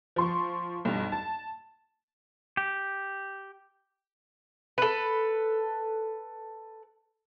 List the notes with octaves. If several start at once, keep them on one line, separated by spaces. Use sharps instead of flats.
F3 C6 C#6
B1 G2
A5
G4
A4 B4